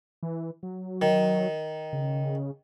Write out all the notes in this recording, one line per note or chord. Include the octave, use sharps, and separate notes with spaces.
E3
F#3
D#3
C#3